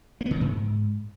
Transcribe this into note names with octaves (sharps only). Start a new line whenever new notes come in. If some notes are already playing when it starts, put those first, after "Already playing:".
A#3
B3
C#3
D#3
G#2